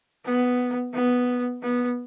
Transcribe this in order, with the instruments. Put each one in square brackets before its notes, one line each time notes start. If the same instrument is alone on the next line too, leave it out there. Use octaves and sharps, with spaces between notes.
[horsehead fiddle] B3
B3
B3